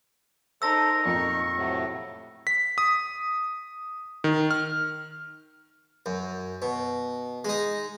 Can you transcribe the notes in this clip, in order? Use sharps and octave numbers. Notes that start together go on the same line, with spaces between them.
D#4 A4 A#4 C5 E6 A#6
F2 A#2 F3 D#4 A#4 C#6
A2 C3 F#3
B6
D#6
D#3
F6
F#2
B2
G#3 D#4